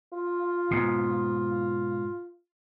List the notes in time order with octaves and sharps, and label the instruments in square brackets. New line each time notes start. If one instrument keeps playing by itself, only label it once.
[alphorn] F4
[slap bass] G#2 B2